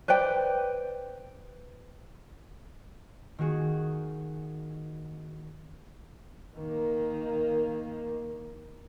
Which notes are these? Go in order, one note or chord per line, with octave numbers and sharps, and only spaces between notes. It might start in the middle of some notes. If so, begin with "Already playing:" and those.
B4 C5 D5 G5
D#3 A#3 F#4 G#4
D#3 A#3